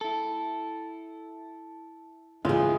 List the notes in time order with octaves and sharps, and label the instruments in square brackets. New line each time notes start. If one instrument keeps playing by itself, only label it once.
[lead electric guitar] E4 A4
[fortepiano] C#2 [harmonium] E3 G#3 [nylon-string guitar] F4 G#4